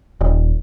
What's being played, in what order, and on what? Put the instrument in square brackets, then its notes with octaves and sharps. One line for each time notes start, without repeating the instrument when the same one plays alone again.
[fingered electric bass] D#1